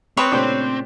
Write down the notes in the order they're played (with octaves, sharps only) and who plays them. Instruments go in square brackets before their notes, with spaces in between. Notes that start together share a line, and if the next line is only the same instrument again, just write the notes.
[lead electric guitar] C4 [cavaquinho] B4 C#5 C#6 [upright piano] G5 C6 D#6
[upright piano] A#2 C#3 A3 [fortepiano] D4 G4 C5